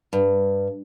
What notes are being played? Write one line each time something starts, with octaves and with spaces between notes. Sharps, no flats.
G2